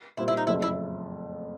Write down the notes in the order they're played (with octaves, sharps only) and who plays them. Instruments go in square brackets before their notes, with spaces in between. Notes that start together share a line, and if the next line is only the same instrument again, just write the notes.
[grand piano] A#2 G3 C4 [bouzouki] E4
[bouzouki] E4
D#4
[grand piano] F#1 F2 C#3 F#3 A3 [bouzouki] E4
[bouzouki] E4